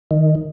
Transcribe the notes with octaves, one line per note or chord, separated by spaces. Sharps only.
D#3